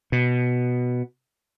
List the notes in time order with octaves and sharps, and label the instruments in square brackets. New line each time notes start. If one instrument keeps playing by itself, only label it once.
[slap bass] B2